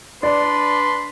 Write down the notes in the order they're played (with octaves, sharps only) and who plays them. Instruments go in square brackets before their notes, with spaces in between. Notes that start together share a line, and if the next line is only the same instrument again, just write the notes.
[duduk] D4 [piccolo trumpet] B4 [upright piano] D5 [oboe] C6